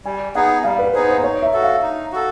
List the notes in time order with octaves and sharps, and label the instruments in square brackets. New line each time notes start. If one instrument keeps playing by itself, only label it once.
[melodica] G3 [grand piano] G#5
[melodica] B3 D#4 G#4 [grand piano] F#5
[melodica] G3 [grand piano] F5
[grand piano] B4
[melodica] B3 D#4 G#4 [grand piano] C5
[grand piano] C5
[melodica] D#4 [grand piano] C#5
[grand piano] E5
[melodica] F#4 A4
[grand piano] F5
[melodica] D#4
F#4 A4